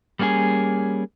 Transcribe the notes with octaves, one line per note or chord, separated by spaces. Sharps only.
G3 A#3 C#4 F#4 G#4